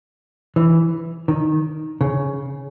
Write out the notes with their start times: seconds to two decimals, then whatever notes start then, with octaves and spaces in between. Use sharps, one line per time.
0.56 E3
1.28 D#3
2.01 C#3